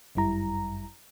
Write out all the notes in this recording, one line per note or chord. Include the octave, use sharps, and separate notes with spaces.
G1 F#2 G3 E4 A#5